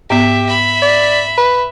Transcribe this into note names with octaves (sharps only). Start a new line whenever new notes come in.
G#2 B3 G4 E5
E5 B5
D5
B4